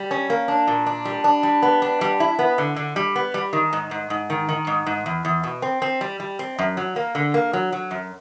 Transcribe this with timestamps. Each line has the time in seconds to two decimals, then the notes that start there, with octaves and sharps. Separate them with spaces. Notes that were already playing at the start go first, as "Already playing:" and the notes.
Already playing: G3
0.11 C#4
0.30 A#3
0.48 D4
0.68 A#2
0.86 D4
1.05 G3
1.24 D4
1.43 G3
1.62 B3
1.82 D4
2.01 G3
2.20 E4
2.39 B3
2.58 D3
2.76 D3
2.96 G3
3.16 B3
3.34 G3
3.53 D#3
3.73 G#2
3.91 G#2
4.10 G#2
4.30 D#3
4.49 D#3
4.67 G#2
4.86 G#2
5.06 E2
5.25 E2
5.43 B2
5.62 C4
5.82 C4
6.01 G3
6.20 G3
6.39 C4
6.59 F#2
6.77 F#3
6.96 A#3
7.15 D3
7.34 A#3
7.53 F#3
7.72 F#3
7.91 F#2